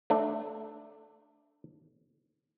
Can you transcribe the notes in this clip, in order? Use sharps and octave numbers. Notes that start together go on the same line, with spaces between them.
A3 D4